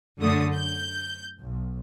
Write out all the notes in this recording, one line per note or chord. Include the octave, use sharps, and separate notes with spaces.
F#2 D3 F#3 A3 D#6
G6
B1